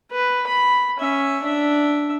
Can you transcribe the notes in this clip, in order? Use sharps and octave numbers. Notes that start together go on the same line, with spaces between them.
B4
B5
C#4 E5
D4 E5